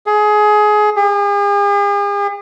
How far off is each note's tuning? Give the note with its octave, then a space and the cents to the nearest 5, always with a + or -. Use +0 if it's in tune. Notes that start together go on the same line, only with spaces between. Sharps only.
G#4 +20
G#4 -45